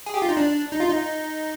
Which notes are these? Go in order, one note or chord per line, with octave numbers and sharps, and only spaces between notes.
G#4
G4
F4
D#4
D4
D#4
F4
D#4